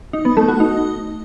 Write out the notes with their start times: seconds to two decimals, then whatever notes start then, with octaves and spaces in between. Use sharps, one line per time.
0.13 D#4
0.25 B3
0.37 A3
0.48 F#4
0.60 D#4